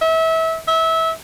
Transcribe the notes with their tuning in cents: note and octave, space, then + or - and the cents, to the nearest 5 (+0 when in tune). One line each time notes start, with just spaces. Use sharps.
E5 -30
E5 -25